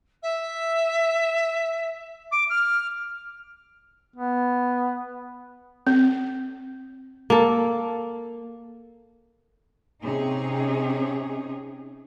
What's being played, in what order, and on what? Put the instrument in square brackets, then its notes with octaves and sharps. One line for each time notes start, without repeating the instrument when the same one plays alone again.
[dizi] E5
D6
F6
[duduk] B3
[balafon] C4
[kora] A#3 A4
[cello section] C3 C#4 D#4 G#4